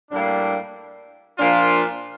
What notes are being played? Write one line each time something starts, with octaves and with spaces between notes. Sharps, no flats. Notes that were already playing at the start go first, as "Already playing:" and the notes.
A2 G3 A#3 D4
A#2 F3 A#3 D4 F4